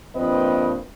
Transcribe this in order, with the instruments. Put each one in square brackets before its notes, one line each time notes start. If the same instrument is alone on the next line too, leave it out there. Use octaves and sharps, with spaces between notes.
[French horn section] G2 F3 A#3 C4 B4 D#5